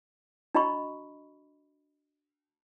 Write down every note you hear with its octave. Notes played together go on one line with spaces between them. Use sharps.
D4 F#4 D#5 A#5 B5 C#6